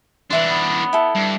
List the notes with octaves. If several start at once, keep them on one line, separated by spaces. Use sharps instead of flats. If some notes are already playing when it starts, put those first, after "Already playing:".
E3 D4 B4 E5 C6
B3
E4 A4
G2